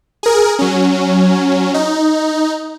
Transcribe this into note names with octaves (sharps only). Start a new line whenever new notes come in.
G#4 A#4
F#3 C#4
D#4